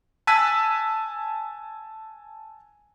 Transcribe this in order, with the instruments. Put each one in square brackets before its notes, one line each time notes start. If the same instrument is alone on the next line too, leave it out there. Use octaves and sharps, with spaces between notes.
[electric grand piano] G#5 A5 E6 F#6 B6 D#7